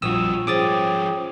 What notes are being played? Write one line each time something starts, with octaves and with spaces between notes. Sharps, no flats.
A#1 F2 G3 F4 F#4 D#6 E6
F3 C#4 G#4 C5 G5 D6 D#6 A6